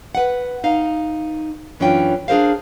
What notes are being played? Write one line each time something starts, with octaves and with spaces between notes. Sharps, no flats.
B4 F#5
D#4 F5
F#2 E3 C#4 D4 F4 G5
D4 G#4 A#4 C5 F5